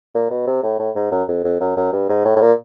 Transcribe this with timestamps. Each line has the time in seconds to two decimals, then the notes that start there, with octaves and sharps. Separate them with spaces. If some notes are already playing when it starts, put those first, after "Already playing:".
0.15 A#2
0.31 B2
0.46 C3
0.63 A2
0.79 A2
0.96 G#2
1.11 F#2
1.28 F2
1.44 F2
1.60 F#2
1.77 F#2
1.93 G2
2.09 G#2
2.25 A2
2.36 A2
2.41 A#2